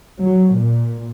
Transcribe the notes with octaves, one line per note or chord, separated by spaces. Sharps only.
F#3
A#2